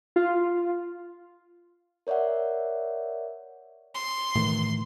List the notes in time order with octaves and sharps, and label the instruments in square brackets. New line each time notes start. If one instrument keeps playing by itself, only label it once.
[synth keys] F4
[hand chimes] A#4 C#5 D5 E5 F#5
[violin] C6
[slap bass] A2 D#3 E3